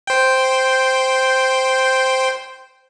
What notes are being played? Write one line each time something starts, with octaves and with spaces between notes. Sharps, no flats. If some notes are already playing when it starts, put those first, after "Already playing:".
C5 G5